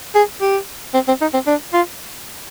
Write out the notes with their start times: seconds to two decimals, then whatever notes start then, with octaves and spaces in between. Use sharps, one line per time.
0.15 G#4
0.41 G4
0.94 C4
1.08 C4
1.21 D#4
1.34 C4
1.47 D4
1.73 F4